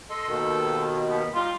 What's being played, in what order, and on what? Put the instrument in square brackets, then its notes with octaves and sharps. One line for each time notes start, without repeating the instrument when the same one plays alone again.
[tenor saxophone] A4 [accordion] D#5 C6
[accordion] D#2 B2 D#3
[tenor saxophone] B3
[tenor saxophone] G3 [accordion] D#4 G4 [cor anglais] F4